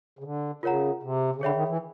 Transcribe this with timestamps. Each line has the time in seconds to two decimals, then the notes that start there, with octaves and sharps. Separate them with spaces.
0.19 C#3
0.24 D3
0.63 C#3 F4 A#4 C#5 F#5 A#5
1.03 C3
1.36 C#3
1.41 D3 G#4 C#5 E5 G5 B5
1.55 D#3
1.68 E3